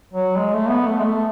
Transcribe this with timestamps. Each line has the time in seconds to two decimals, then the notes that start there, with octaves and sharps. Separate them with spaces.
0.13 F#3
0.37 G#3
0.54 A3
0.69 B3
0.87 A3
0.99 G#3
1.04 A3